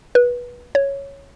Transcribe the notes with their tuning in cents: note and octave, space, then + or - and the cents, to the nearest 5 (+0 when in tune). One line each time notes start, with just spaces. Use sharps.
B4 -20
C#5 +0